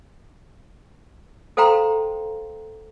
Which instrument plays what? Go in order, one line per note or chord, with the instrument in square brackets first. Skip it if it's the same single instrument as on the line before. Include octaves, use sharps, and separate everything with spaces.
[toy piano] A4 C5 F5 G5 A#5 C6